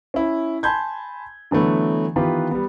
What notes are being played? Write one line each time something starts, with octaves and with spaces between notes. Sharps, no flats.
C#4 E4
G#5 A5 B5 C6 G6 G#6
D3 E3 F#3 A3 B3
D#3 E3 B3 F4 G4 B4
G3 B3